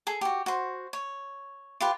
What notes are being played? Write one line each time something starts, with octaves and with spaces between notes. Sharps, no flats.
G#4 A4
F#4 G4
F#4 C5
C#5
F4 G4 B4